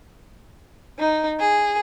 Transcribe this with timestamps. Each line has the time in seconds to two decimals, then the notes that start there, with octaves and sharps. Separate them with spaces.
0.99 D#4
1.40 G#4